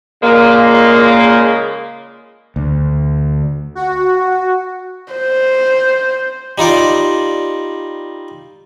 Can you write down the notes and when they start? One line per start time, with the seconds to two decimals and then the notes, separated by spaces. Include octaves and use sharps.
0.23 A#2 C#3 G#3 A#3
2.56 D2
3.75 F#4
5.13 C5
6.58 G3 D#4 F4 D5